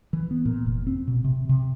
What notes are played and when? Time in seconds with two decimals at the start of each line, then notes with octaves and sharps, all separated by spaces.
0.13 E3
0.31 B3
0.45 A#2
0.66 F1
0.87 C4
1.07 B2
1.24 C3
1.49 C3